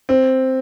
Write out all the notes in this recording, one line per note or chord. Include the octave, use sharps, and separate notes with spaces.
C4